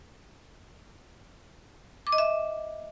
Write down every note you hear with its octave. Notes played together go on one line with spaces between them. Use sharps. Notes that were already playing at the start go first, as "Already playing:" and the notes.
D6
D#5
E5